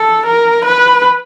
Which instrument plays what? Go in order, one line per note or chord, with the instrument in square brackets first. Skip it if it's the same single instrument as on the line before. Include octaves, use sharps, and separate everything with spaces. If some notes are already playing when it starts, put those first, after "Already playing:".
Already playing: [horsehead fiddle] A4
A#4
B4